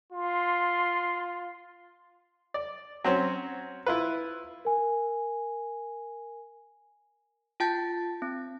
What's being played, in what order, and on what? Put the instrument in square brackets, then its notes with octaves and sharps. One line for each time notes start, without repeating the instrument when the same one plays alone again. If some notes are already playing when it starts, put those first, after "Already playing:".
[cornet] F4 [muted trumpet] C6
[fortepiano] D5
F#3 C4 C#4
E4 F4 B4
[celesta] A#4 G#5
[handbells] F4 G5 A5 G6 A6
C4